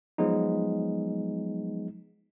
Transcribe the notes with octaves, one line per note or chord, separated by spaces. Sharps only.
F3 F#3 G#3 B3 D#4